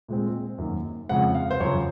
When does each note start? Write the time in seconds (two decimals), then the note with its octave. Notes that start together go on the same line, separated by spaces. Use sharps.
0.08 A#2 G#3 C4
0.58 F#2 D#3 A#3
1.09 F2 C#3 G#3 C4 F#5
1.35 F5
1.51 C5
1.60 F#2 C#3 F3 C#5